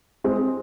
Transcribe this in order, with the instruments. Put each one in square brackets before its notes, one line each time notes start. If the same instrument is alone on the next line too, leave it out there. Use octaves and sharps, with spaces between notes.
[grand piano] G#3 C4